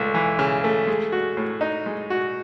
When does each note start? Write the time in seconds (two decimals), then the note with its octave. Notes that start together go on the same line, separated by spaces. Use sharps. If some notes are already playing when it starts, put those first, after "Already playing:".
Already playing: C#2 A3
0.14 E3
0.39 C#3
0.64 A3
0.87 G#3
1.12 F#4
1.37 A2
1.61 D#4
1.86 G#3
2.10 F#4